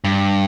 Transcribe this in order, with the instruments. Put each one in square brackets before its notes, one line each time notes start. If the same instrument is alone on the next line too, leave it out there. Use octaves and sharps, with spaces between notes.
[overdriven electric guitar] G2